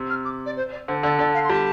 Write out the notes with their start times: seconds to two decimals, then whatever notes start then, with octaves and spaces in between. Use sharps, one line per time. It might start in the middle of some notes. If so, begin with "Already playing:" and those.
Already playing: C3
0.10 F6
0.25 D6
0.46 D5
0.57 C5
0.72 D5
0.88 D3 C5
1.03 D3 D5
1.19 D3 D5
1.35 F5
1.44 C6
1.50 G3 A5